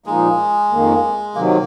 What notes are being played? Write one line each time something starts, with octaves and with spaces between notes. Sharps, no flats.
A#2 F3 G#3 A#3 D#4
F2 D#3 A#3
C3 D#3 F#3 A#3